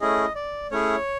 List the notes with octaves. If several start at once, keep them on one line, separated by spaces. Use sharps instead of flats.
A3 C#4 E4 G#4 D#5
D5
A3 C#4 E4 G#4 C#5